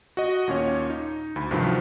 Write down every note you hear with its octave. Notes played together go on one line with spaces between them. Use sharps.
F#4 D#5
D#2 A#2 C#4 C#5
D#4
D2 B5
C2 G2 C3 D#3 F3 F#3